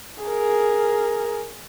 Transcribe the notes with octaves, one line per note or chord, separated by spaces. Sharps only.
G#4 A#4